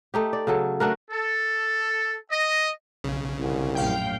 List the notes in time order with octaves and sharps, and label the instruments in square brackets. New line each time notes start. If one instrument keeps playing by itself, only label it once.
[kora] A3 D#4 G4
D5
C#3 F#3 A4
A3 D4 F#4 A#4
[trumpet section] A4
D#5
[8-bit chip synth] B1 C#3
[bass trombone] C2
[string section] A#1 F#2 A2 [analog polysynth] F5 G5